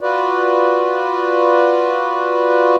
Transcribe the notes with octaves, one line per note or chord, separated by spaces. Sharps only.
F4 F#4 B4 D5